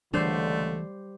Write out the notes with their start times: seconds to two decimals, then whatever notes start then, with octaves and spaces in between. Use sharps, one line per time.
0.13 C#2 D3 E3 G3 A3 D4 C5 C6